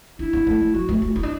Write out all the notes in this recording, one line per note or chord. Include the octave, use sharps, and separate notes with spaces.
D4 E4
B3
A3
A3
F#3 F#4
A3
F#4
A3
B3 E4
D4